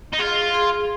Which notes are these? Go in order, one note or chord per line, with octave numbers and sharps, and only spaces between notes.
D#4
F4 G#4
G#4